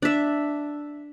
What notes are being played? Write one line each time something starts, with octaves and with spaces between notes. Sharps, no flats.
D4 E5